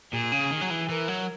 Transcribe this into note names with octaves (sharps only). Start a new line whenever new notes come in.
A#2 G#4
C#3
D#3
F#3
E3
E3 A#4
F#3